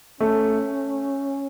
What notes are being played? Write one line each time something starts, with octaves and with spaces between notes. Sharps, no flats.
A3 C#4